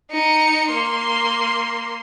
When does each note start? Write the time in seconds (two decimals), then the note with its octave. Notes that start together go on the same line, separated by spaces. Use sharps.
0.11 D#4 C#7
0.70 A#3 C6